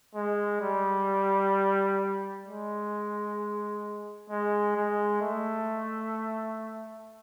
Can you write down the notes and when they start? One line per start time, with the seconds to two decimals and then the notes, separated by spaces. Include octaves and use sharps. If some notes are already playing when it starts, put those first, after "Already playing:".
0.15 G#3
0.61 G3
2.45 G#3
4.30 G#3
4.76 G#3
5.21 A3